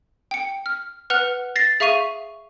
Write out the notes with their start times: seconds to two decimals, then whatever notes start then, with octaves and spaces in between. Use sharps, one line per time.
0.31 G5 C#7
0.66 F6
1.10 B4 F#5 F6 F#6 F7
1.56 A6 A#6 C7
1.80 G#4 E5 F5 C#6 D#7 F7